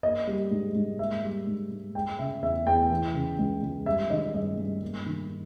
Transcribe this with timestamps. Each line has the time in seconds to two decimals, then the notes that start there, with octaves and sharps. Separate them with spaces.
0.03 A#3 D#5
0.27 G3
0.51 G#2
0.75 G#2
0.99 A#3 E5
1.23 G3
1.47 G#2
1.71 G#2
1.95 G#3 G5
2.19 C#3 E5
2.42 E2 E5
2.66 E2 G5
2.90 E3
3.14 C#3
3.39 C#2
3.63 C#2
3.86 G3 E5
4.10 D#3 D#5
4.34 G2 D#5
4.58 G2
4.82 A#3
5.06 D#3